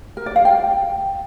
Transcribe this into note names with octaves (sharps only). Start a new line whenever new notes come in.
A#4
D5
F5
G5